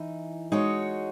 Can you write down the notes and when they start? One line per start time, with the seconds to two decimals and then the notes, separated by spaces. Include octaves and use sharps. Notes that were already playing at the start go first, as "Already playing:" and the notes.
Already playing: E3 D#4
0.52 G#3 D#4 F#4 C#5